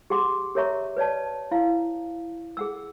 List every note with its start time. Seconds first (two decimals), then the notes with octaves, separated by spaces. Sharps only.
0.10 G4 G#4 F#5 C6 D6
0.55 G4 A#4 C#5 E5 A#5 C#6
0.97 B4 C#5 D5 A5
1.51 E4 F5
2.57 G#4 F#5 E6